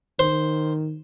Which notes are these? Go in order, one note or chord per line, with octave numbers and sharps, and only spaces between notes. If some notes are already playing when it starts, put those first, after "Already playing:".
D#3 C5